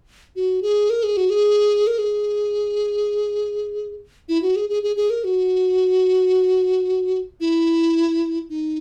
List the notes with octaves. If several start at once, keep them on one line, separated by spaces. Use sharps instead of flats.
F#4
G#4
A#4
G#4
F#4
G#4
A#4
G#4
E4
F#4
G#4
G#4
G#4
G#4
A#4
F#4
E4
D#4